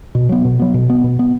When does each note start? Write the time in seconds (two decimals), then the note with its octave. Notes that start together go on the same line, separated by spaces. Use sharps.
0.15 B2
0.29 F#3 B3
0.45 B2
0.59 F#3 B3
0.74 B2
0.90 B3
1.04 B2
1.19 B3